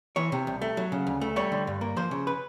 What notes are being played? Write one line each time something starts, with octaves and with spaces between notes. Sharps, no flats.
E3 C#5
C3
C2
A3
F#3
C#3
D2
A3
G3 C#5
D3
G2
A#3
F3 C5
C#3
B4